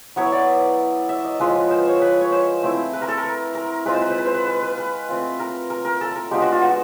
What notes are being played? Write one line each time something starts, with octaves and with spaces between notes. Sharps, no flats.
F#3 B3 E4 C#5
D5
E5
D#5
F3 G#3 C#4 F4 B4
B4
C5
C#5
B4
C#5
C5
A3 C4 E4
B4
A#4
A4
A#4
A#4
G#3 C4 F4 B4
C5
B4
C5
B4
C5
B4
B4
B4
B4
A3 C4 F4
A#4
A#4
A#4
A4
A#4
G#3 B3 D4 F4 G4
F#4
F4
F#4